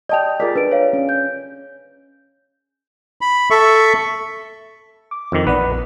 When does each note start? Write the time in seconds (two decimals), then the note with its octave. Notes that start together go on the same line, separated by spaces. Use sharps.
0.09 D5 D#5 G5 A5 F7
0.40 F4 G#4 A#4 D5 B6
0.56 D4 B4 D7
0.71 C#5 F5
0.93 C#4
1.09 G6
3.21 B5
3.50 A4 E5 C#6
5.11 D6
5.32 F2 D#3
5.47 A#1 B3 B4 D5